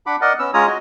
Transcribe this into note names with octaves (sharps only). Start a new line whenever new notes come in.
D4 F#5 B5 D6
A#4 D5 D#5 F#5
B3 C#4 E6
G#3 C#4 F4 C#5 A#5 D#6
F#4 D#5